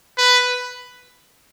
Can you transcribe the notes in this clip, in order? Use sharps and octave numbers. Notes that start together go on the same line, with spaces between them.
B4